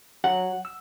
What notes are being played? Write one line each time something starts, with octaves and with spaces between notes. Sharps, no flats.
F#3 F#5
E6